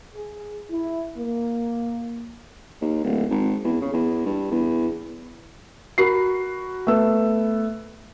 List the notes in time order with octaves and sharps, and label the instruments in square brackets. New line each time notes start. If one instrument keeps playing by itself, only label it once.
[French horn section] G#4
E4
A#3
[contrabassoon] D#2
D1
G#1
E2
C#3
E2
G2
E2
[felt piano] F#4 A#4 B5 C7
A3 B3 E6